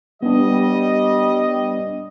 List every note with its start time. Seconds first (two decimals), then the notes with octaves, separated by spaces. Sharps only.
0.23 G3 B3 D4 D#5